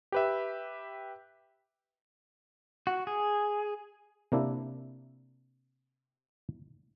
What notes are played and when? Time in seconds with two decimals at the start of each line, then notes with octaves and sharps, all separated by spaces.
0.12 G4 B4 E5
2.87 F#4
3.07 G#4
4.32 C3 A#3 D4 E4